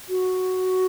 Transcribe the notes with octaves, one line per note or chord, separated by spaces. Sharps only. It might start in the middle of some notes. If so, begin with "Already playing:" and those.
F#4